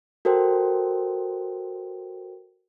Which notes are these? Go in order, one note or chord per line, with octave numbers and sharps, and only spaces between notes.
F#4 A4 A#4 C5 G5